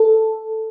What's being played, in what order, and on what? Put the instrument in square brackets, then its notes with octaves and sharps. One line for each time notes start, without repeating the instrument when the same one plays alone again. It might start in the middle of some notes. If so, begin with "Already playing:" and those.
Already playing: [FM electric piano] A4